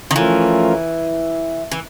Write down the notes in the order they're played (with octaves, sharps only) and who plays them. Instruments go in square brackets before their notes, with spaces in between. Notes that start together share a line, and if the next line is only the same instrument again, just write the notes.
[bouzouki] D#3
[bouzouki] E3 [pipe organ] F3 A3 C#4 F4 A#4
[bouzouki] E3